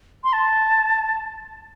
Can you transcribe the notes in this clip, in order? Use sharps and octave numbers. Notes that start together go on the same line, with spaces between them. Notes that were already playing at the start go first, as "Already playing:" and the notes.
C6
A5